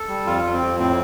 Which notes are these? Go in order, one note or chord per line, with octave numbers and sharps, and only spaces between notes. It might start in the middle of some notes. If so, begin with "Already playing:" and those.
Already playing: A4
G3
F2 F4
F2
C4
F2
A2 C4